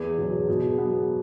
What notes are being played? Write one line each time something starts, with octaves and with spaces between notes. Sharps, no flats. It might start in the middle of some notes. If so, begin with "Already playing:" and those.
Already playing: E2 G#4
B2 F#3
B2
F#3 B3